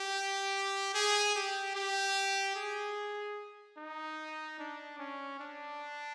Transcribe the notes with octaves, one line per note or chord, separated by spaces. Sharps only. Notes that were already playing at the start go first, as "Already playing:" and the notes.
Already playing: G4
G#4
G4
G4
G#4
D#4
D4
C#4
D4